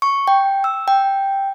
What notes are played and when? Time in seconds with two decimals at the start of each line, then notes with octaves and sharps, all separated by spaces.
0.02 C#6
0.28 G5
0.64 E6
0.88 G5